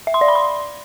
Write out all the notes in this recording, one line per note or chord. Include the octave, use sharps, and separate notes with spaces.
E5
C6
D5
B5
C6